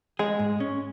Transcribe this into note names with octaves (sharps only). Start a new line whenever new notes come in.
G#3 G#4
G#2
C#4